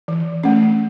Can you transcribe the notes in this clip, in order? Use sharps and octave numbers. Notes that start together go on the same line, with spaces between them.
E3
A3 C#4